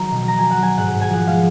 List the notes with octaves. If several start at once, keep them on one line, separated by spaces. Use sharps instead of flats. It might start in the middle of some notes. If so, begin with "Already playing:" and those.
Already playing: D#3 F#3 A#5
B2
F#3 A#5
F#3 G#5
F#5
F#3 G#5
G#2 F#5
G#2
G#5
F3 F#5
G#3 F5